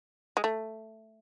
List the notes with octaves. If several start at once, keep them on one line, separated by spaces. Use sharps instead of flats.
G#3
A3